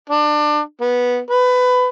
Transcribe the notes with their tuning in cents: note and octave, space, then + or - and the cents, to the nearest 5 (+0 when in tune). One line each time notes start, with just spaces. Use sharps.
D4 +25
B3 -10
B4 +20